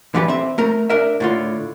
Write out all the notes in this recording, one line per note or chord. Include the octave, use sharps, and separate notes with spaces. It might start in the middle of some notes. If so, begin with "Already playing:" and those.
D3 E3 G4 B4
C4 E5
A3 A#4 A#5
D4 A#4 E5
A2 D3 F4